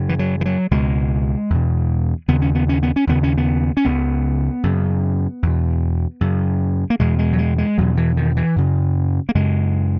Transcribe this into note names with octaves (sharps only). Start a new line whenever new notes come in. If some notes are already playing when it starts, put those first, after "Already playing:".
Already playing: F#2 C#3
E3
F#3
E3
F#3
C#2 B2 G#3
E2 B2
D#2 C#3 B3
C#4
B3
C#4
B3
C#4
D#2 C#3 B3
C#4
B3
C#4
C#2 C#3 B3
F#2 C#3
E2 B2
F#2 C#3
A#3
E2 B2 G#3
G#3
F#3
G#3
G#3
E2 B2 F#3
E3
D#3
E3
F#2 C#3
A#3
F#2 C#3 G#3